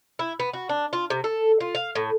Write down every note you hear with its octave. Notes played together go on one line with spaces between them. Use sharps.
E4
B3
F#4
D4
F4
C3
A4
F4
F5
A2